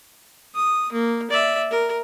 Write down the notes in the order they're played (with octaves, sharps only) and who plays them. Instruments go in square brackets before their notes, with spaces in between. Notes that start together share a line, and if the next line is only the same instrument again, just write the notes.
[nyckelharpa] D#6
A#3
D5 E5
A#4